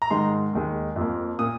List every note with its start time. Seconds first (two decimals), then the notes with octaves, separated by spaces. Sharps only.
0.02 A#5
0.10 G#2 D#3 G#3 C6
0.53 D#2 D#3 G#3
0.96 F2 F3 A#3
1.39 A#2 A#3 D#6